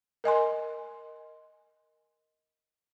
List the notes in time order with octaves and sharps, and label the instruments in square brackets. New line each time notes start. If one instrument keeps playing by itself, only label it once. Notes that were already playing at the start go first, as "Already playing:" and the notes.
[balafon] A#4 D#5 G#5 C6